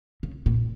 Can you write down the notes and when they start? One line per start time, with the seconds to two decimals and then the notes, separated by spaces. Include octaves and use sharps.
0.23 C#3
0.46 A#2